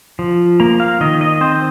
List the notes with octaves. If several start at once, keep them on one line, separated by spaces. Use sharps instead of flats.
F3
A#3 A#5
F5
D#3 D#5
D#5
C4 C5